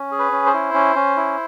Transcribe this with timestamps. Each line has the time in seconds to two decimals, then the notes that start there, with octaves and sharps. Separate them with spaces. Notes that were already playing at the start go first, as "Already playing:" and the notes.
Already playing: C#4
0.12 G#4
0.19 B4
0.32 C#4
0.46 C5
0.54 E4
0.74 C#4
0.96 C#4
1.17 E4